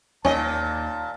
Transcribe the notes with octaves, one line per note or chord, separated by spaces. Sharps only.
D#2 A#2 C#4 D#5 A5